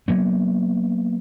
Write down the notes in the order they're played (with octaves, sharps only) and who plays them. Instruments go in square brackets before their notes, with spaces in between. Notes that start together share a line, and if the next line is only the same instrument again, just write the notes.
[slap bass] F#3 A#3 B3